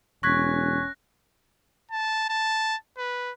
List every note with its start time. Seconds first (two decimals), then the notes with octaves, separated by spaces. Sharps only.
0.23 E1 C#4 C#6 F#6 G#6 A#6 B6
1.91 A5
2.29 A5
2.98 B4